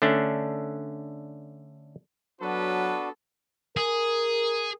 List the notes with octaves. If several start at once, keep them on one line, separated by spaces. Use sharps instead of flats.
D3 A3 C#4 D4
F#3 B3 D4 F#4 A4 B4
G#4 A#4